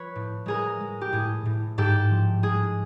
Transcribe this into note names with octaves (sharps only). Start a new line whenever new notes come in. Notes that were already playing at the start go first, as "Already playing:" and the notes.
Already playing: F3 B4 C#5
A2
G#3 G#4 A#4
G#3
G4
A2 G#4
A2
G#2 G4 A4
F3
G#3 G#4